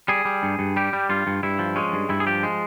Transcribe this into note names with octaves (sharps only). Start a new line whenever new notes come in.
G3 G#4
G3
G2
G2
G3 G4
G3
G2 F4
G2
G2 E4
F3
G#3 C#4
G2
G2 E4
G#4
F3 G4
G#3